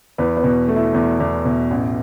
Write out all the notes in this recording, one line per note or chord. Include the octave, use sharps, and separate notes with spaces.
E2 B3 B4
B3 B4
B2
A3
E4
E2
E2
B2
A1